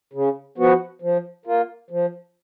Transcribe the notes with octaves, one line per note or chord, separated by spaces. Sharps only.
C#3
F3 B3 F#4
F3
A#3 F4
F3